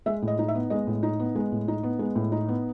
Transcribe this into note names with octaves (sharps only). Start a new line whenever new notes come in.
G#3 E5
A2
D#5
D#4
E5
B3
G#3 D#5
A2
D#4
B3
G#3
A2
D#4
B3
G#3
A2
D#4
B3